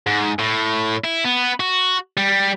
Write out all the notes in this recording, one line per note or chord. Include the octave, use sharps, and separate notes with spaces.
G#2
A2
E4
B3
F#4
G3